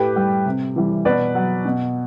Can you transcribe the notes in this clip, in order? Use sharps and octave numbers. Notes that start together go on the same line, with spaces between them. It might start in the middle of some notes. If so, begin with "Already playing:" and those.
Already playing: A2 G4 B4
G3
C3
E3 G3
B2 B4 D5
F#3
B2